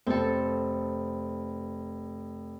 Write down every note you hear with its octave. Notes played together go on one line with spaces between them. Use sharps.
F1 C4 A4